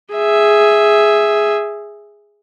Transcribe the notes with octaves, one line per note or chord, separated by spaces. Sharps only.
G#4 E5